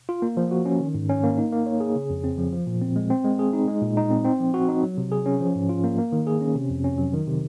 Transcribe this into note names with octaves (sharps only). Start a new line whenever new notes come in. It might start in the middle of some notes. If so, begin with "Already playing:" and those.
F4
A#3
F3
F#4
C#4
D#3
G#2
C#4
A#3
D#4
A#3
C#5
G#4
C#3
F2
C4
F3
F3
A#2
C4
G#3
C4
G#3
G#4
D#4
G#3
A#2
D#4
C4
C4
F3
F#4
D#4
F#3
C3
G#4
C#4
F3
G#2
F4
A#3
A#3
D#3
G#4
C#4
C3
F2
C#4
F#3
D#3
C3